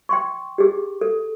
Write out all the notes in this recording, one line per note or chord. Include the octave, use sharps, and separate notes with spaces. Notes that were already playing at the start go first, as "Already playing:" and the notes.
G5 C6 C#6
G4 G#4
A4